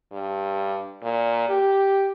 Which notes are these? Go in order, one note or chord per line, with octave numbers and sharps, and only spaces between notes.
G2
A#2
G4